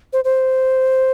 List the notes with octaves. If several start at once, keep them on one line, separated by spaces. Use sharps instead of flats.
C5
C5